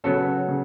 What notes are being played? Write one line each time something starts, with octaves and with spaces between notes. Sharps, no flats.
C#3 F#3 B3 C#4 F#4 A4
C#3 C#4